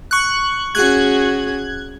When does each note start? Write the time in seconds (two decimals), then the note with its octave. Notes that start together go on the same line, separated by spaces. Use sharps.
0.11 C#6 F#6
0.75 C#4 F#4 G#4 F#6 G#6